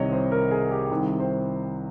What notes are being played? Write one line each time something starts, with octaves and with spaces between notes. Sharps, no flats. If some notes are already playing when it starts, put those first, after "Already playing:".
Already playing: C2 C3 D#3 C#5 D#5
C5
A#4
G#4
G4
C2 C3 D#3
C5